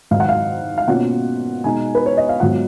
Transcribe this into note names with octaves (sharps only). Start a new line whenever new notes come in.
G#2 D#3 F#3 F5
F#5
F5
F5
B2 A#3 C#4 F4 F#5
B2 G#3 D#4 G#5
B4
C#5
D#5
F5
G#2 F#3 B3 F4 F#5